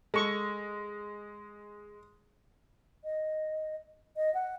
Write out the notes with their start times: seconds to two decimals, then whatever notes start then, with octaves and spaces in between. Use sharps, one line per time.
0.14 G#3 A4 C#6
3.04 D#5
4.17 D#5
4.34 F#5